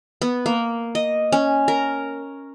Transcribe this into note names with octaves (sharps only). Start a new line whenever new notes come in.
B3
A#3
D#5
C#4
A#4